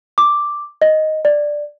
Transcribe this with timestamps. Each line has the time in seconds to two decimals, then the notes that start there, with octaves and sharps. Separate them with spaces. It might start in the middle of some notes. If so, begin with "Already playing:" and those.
0.18 D6
0.82 D#5
1.25 D5